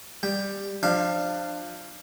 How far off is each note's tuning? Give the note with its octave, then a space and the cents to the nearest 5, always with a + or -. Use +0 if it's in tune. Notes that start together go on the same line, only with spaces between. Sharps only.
G3 +10 G5 +5
F3 +20 D4 +25 F5 -15